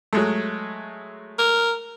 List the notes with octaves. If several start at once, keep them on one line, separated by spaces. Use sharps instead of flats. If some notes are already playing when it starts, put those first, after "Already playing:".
F#3 G#3 A3
A#4